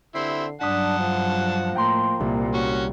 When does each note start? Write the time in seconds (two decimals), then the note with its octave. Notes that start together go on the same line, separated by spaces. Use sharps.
0.15 D3 C4 E4 C7
0.61 G2 F#3 D4 F#5 A5 D#6 F#6 B6
1.00 F3
1.75 A2 A#3 G5 A#5 C6
2.20 C2 A#2
2.54 C#4 F#4